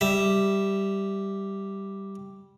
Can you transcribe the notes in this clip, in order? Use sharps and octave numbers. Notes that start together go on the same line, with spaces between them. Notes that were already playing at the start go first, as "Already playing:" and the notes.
G3 E5